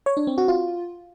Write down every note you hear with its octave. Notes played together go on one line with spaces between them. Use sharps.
C#5
D4
C4
F#4
F4